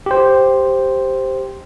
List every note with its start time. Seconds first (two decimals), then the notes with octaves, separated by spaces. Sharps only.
0.06 G4 C5